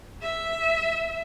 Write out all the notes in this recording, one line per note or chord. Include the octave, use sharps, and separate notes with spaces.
E5